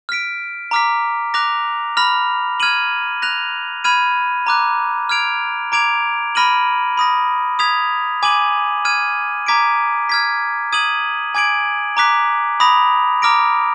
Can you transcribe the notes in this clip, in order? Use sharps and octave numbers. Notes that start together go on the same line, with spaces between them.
F6 B6 D7
A#5 D6 F6 B6
D6 F#6 A#6 F7
B5 F6 A#6 F7
F6 G#6 D#7 F#7
F#6 A#6 F7
B5 F6 G#6 D#7
A#5 D6 F#6
F6 G#6 D7 F7
A#5 D6 G#6 D7 F7
B5 F6 A#6 D#7 F#7
B5 D#6 A#6
D#6 G#6 B6 F7
G#5 D6 G#6 D#7 F#7
F6 G#6 D#7
A#5 D6 G#6 B6 D7
F6 G#6 B6
D#6 G#6 D#7 F#7
G#5 D6 G#6 D7 F#7
A#5 D6 F#6 B6
B5 D#6 A#6 F7
A#5 D6 F6 A#6 D7